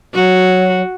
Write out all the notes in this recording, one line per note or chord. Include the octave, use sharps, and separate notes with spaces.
F#3 F#4